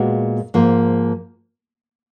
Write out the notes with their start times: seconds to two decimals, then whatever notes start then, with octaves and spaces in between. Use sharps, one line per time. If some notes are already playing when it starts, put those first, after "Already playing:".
Already playing: A#2 G#3 B3 F#4
0.54 G#2 F3 A#3